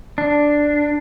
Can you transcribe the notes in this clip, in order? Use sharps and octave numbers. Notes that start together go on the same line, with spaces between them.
D4